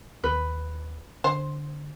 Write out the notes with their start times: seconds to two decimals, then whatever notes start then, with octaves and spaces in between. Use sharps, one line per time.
0.24 D#2 B4
1.24 D3 C5